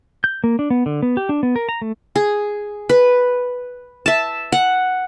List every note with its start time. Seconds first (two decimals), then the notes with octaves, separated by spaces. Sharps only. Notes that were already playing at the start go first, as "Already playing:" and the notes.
0.24 G6
0.44 A#3
0.59 D4
0.70 B3
0.86 D3
1.02 B3
1.17 G4
1.29 D4
1.43 B3
1.56 A#4
1.69 A#5
1.82 A3
2.16 G#4
2.89 B4
4.06 E5 A5
4.52 F#5